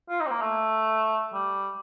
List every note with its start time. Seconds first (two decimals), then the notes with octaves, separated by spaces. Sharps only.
0.10 F4
0.20 D#4
0.26 C4
0.31 A#3
0.41 A3
1.33 G3